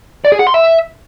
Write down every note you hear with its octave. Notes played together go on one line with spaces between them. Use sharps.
D5
G#4
F#5
C6
E5